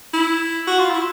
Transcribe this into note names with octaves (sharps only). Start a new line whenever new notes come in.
E4
F#4
F4
E4